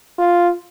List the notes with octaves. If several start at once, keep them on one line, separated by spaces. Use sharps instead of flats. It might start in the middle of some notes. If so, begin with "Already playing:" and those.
F4